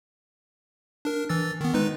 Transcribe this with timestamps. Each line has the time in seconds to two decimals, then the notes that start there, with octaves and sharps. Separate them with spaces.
1.05 D4 A#4
1.29 E3 E6 A6
1.61 D#3 B3
1.74 G#3 D#4 B4